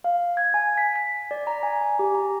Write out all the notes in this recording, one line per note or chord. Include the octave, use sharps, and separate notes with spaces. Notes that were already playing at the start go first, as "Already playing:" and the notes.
F5
G#6
G#5
B6
B6
D5
A#5
G#5
G#5
G4
A#5